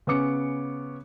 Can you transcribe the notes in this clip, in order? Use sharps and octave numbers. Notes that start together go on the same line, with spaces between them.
C#3 B3 C#4 D6 C#7